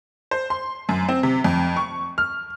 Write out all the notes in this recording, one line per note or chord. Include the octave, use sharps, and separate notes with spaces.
C5
C6
F#2
C4
C3
F2
C#6
F6